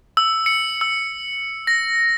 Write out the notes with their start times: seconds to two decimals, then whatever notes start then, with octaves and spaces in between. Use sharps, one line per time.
0.17 E6
0.46 C#7
0.81 E6
1.67 A#6